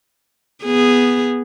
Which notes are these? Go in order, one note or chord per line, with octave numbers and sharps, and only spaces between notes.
B3 G#4